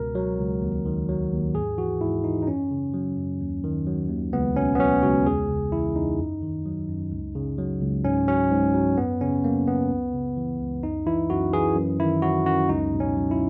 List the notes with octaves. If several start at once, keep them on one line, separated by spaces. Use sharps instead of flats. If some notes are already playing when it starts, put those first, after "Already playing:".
Already playing: C#2 B2 A#4
F#3
C#2
D#2
D#3
F#3
D#2
G#2 G#4
E3 F#4
G#2 E4
E3 D#4
D#4
F#2 C#4
C#3
F#3
F#2
D#2
D#3
F#3
D#2
C#2 B3
B2 C#4
B3
F#3 C#4
C#2 F#4
E2 G#4
C#3
E3 E4
E2 D#4
F#2
D#3
F#3
F#2
C#2
C#3
F#3
C#2
G#2 C#4
F#3 C#4
G#2
F#3
F#2 B3
C#3 C#4
F#3 A#3
F#2 B3
C#2
C#3
E3
C#2
F#2 D#4
E3 E4
F#2 F#4
E3 G#4
F#2
D#3 E4
F#3 F#4
F#2 F#4
C#2 D#4
B2
C#4
F#3
E4